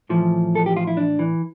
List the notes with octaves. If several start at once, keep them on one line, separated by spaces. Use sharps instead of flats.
A2 E3 F3
A4
G4
F4
E4
D4
E3